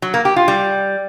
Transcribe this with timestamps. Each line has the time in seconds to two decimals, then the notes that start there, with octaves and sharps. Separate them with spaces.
0.02 F#3
0.14 A#3
0.25 G4
0.36 F4
0.48 G3